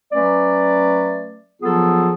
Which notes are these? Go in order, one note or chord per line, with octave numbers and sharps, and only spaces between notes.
F#3 A3 C#4 B4 D5
F3 F#3 B3 F4 G#4 A4